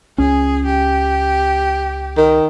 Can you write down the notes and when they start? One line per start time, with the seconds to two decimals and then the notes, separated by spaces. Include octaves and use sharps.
0.18 C#2 C#4 G#4
0.66 G4
2.17 D#3